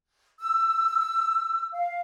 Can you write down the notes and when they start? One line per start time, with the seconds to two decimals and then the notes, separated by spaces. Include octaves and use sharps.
0.40 E6
1.72 F5